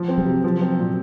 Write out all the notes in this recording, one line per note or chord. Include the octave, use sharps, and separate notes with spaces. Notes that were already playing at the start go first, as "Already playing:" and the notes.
Already playing: F3
C4
F#3
C3
F3
C4
A#2